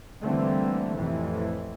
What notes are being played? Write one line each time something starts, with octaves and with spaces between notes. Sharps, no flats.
D3 E3 G3 A3 A#3 C4
F2 A2 C3 E3